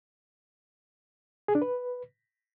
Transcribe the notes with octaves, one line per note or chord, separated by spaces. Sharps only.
G#4
D4
B4